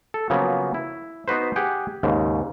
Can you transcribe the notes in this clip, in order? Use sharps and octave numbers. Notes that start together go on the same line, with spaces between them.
A4
C#3 F3 F#3 A#3 B3
E4
B3 D#4 F#4 B4 C5
G4 G#4 F#5 G5
D#2 G#2 C#3